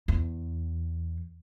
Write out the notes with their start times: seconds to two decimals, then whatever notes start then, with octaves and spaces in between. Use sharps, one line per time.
0.08 E2